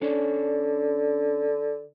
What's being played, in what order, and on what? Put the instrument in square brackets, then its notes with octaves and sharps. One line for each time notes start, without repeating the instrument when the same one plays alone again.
[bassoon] D3 [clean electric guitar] C#4 D4 C#5